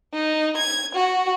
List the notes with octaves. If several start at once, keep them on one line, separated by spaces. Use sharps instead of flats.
D#4
G#6
F#4